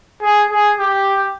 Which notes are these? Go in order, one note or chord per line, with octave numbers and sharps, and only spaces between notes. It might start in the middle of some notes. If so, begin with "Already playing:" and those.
G#4
G#4
G4